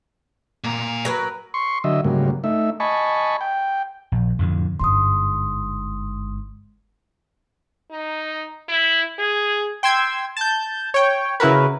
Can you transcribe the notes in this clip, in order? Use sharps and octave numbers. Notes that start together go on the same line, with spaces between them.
A#2 A#4
F#3 A#4 B4
C6 C#6
D3 F#3 D#5 E5
G#2 C#3 F#3 G3 A#3
A3 D#4 E5
D#5 G#5 A5 B5 C#6
G5
A#1
F2 A2 D3
G1 G#2 C6 D#6
D#4
E4
G#4
G5 C6 E6 G#6
A5 G6
C#5 G5
C#3 E4 F#4 A#4 B4